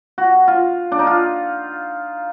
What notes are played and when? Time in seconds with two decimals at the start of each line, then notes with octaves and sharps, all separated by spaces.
0.18 F#4
0.48 F4
0.92 D4
0.99 D#4
1.07 F4